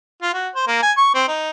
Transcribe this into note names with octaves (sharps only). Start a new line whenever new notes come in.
F4
F#4
C5
A#3
G#5
C#6
C4
D#4